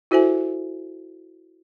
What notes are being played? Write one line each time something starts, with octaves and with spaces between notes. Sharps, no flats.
E4 F#4 A4 C5 E5 G#5